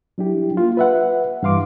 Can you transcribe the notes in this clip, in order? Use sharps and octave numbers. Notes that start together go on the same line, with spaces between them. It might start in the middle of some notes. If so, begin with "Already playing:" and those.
F#3 D4 E4 G4
A#3 F4
B4 E5 F#5
G2 E3 F5 C6 D6